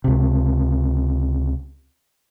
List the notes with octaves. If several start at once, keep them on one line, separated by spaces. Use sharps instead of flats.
C#2 C3